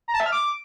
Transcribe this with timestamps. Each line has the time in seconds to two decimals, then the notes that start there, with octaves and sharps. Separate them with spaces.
0.08 A#5
0.14 A5
0.20 E5
0.26 F6
0.32 D6